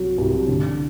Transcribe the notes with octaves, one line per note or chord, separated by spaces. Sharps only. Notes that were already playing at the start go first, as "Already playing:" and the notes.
Already playing: C2 F#3
C2
D3